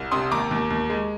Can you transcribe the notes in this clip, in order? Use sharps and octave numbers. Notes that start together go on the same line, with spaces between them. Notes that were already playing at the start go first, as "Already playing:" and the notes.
Already playing: C2
C3 C6 D#6
D#2 A#5 D6
D#2
D#2
G#3